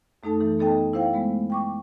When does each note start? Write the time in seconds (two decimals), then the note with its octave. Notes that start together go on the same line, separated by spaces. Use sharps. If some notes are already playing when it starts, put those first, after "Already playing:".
0.23 F#2 A3 D#4 A4 A5
0.40 E3 A4
0.59 B3 D#4 A4 D#5 G5 A5
0.93 E4 C5 F5 G5
1.13 G#3 A3 B3
1.50 G5 C#6 D6